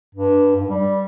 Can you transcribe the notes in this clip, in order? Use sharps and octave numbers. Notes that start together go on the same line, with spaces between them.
G2
G2
G3